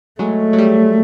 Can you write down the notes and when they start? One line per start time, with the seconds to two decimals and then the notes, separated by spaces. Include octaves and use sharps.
0.19 F#3 G#3 A3
0.53 F#3
0.58 G3